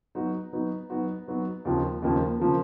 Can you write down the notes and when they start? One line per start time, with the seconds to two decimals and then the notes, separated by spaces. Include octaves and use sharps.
0.15 F#3 B3 D#4 F#4
0.53 F#3 B3 D#4 F#4
0.90 F#3 B3 D#4 F#4
1.28 F#3 B3 D#4 F#4
1.65 D#2 C#3 F3 A#3
2.02 D#2 C#3 F3 A#3
2.40 C#3 F3 A#3